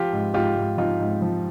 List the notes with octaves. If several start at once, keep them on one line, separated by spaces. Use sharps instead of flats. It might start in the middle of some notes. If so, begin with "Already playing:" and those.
Already playing: F3 F4 G4
G#2
G#2 F4 G4
G#2
F3 D#4 F4
G#2
F3